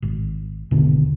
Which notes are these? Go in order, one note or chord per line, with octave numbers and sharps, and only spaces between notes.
G#1
G#1 D#2 B2 D3